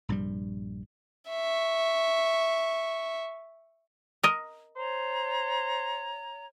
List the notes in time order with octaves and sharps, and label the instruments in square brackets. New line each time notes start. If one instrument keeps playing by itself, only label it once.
[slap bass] A#1 G2 C3 G3
[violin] E5 C#6
[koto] A#4 D#5
[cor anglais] C5 [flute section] C#5 A#5